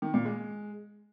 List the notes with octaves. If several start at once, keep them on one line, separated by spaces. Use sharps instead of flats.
D#3
A#2
G#3